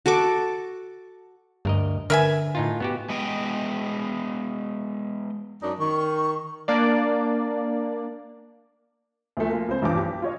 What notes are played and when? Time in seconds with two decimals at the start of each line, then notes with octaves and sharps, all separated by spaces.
0.06 F#4 A4 C#6 D6
1.65 D2 G2 A#4 D#5
2.10 D3 A#4 B4 E5 G#5
2.55 A2 D#4 F4
2.80 B3 F#4 G4
3.10 G#3 B3 D#5 G5
5.62 F#2 D4 D#4
5.80 D#3 C#6
6.68 A#3 D4 D5
9.37 D2 F3 A3
9.49 A#3 F4
9.68 C#2 C4 C5
9.82 B1 E2 G2 F3 D6
9.97 G4
10.22 F4 C#5 D#5